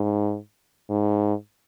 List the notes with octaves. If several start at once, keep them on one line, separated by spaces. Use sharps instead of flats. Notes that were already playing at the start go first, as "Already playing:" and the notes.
Already playing: G#2
G#2